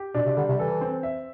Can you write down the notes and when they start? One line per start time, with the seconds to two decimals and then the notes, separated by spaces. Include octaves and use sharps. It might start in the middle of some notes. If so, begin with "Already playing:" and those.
Already playing: G4
0.15 B2 D4
0.26 C3
0.37 D3 G3
0.49 C3
0.59 E3 A4
0.81 C4
1.03 E5